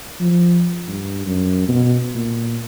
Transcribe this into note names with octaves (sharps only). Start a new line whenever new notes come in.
F3
G2
F#2
B2
A#2